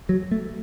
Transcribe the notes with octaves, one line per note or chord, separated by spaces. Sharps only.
F#3
A3